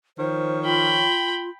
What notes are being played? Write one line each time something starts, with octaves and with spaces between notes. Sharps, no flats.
D#3 F3 C5 C#5
F4 G5 B5